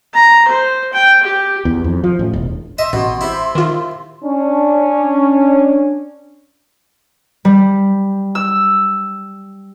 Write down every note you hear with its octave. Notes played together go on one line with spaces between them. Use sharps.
A#5
C5
G5
G4
E2
F2
F3
A1
E1
D#5 E5 C6
A1 B2
C3 E4
D#3 F4
C#4 D4
G3
E6